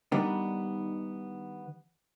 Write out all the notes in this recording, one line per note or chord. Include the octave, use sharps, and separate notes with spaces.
D#3 G3 B3 D4 D#4 B4